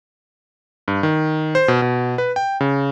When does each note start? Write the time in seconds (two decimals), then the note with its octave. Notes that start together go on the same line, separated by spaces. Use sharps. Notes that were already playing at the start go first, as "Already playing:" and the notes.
0.88 G2
1.03 D#3
1.55 C5
1.68 B2
1.82 B2
2.18 B4
2.36 G5
2.61 C#3